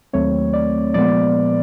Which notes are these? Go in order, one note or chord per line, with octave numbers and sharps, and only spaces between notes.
D#2 D#3 F#3 A3 C4 C#5
D5
A#2 F3 G#3 B3 D5